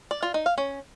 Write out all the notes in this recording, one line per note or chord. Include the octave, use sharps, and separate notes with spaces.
D5
F4
D#4
F5
C#4